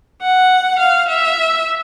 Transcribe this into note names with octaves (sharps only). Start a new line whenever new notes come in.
F#5
F5
E5